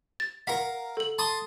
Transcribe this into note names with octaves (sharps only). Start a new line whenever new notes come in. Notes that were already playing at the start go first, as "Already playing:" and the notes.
A6
A#4 F5 F#5 B6
A4 F#7
A5 C6 D#6